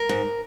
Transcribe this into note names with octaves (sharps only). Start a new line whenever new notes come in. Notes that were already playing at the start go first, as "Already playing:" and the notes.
Already playing: A#4
G#2